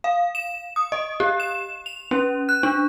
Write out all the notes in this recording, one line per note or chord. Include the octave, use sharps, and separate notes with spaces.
F5
E7
D#6
D#5
G4
E7
F7
C#4
F#6
D4